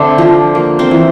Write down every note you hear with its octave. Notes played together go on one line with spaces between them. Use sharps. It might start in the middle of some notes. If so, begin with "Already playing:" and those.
Already playing: D3 A3 C4 D4 C5 D5
F3
A#3
C4 C5
E3